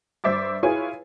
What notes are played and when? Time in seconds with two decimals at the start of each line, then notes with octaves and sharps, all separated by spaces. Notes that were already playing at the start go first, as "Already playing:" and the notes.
0.24 G2 C5 E5 D6 A6
0.63 E4 F4 G#4 B4 C#5 G#5